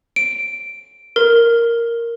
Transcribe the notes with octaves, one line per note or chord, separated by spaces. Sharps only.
D7
A#4